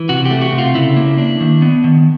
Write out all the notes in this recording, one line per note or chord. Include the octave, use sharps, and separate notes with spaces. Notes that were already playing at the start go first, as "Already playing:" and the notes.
Already playing: E3
C3 F#4
G4
A3
F#4
C3
F4
C#3 E4
A#3
D4
D#3
B3
D#3